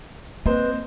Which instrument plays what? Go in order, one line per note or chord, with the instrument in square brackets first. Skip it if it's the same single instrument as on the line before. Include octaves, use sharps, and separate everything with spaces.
[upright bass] A#3 [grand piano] C4 C5 D#5 [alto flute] B4